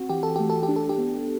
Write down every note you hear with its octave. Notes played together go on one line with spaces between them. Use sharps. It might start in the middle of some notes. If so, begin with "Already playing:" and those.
Already playing: C4 F#4
E3 G4
A4
A3 G4
A4
G4
D4
A4
G4
B3